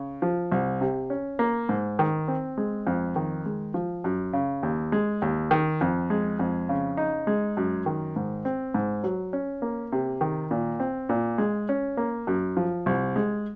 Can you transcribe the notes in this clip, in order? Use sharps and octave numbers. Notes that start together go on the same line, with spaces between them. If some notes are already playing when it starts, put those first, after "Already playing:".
Already playing: C#3
F3
C2
C3
C#4
A#3
G#2
D#3
C4
G#3
F2
D#3
G#3
F3
F#2
C#3
D#2
G#3
D#2
D#3
F2
G#3
F2
C#3
D#4
G#3
F#2
D#3
G#2
C4
G#2
F#3
C#4
A#3
C3
D#3
A#2
C4
A#2
G#3
C#4
A#3
F#2
F3
C2
G#3